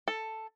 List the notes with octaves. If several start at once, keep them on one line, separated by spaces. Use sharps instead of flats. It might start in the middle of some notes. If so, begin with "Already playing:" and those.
A4